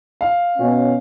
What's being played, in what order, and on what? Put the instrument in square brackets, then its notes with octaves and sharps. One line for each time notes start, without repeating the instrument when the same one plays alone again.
[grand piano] F5
[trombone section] B2 C#4